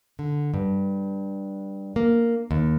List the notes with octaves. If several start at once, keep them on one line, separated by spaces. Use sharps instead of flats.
D3
G2
A#3
D#2